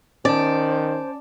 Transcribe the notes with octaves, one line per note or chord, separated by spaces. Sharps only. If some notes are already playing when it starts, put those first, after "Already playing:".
D#3 C#4 C5 D5 A5